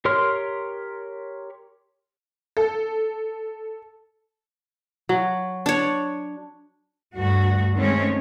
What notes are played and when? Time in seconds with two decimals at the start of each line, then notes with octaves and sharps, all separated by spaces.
0.05 G4 A#4 C#5 C6 F6
2.57 A4
5.09 F#3
5.66 D4 C#5
7.16 D2 G2 F#4
7.76 D#3 G#3 A3 C4 C#4 C#5